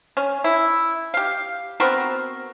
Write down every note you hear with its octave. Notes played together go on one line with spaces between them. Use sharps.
C#4
E4
G4 F5
B3 C4 F#4 A#4